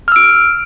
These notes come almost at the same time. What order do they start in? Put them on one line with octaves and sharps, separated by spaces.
F6 E6 D7